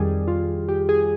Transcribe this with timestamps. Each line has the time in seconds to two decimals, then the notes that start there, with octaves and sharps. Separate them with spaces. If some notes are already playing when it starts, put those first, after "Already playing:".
Already playing: F2 D#3 G3 G#4
0.28 F4
0.69 G4
0.89 G#4